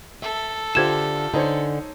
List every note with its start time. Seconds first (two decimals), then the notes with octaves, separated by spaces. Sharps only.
0.22 A4 E5
0.75 D3 F4 G4 C5 E5 G#6 E7
1.34 D3 D#4 C5 C#5 G#5